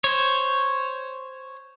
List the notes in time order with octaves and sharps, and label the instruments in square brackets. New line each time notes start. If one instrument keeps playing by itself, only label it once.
[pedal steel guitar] C5 C#5